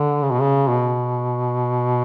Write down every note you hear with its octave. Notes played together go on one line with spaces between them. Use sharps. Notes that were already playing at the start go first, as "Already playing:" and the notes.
Already playing: D3
C#3
B2
C#3
B2